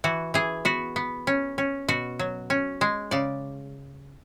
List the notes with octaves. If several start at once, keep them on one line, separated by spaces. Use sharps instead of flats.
E3 F#4
E3 G#4
B3 F#4
B3
C#4
C#4
B2 F#4
F#3
C#4
G#3
C#3 D5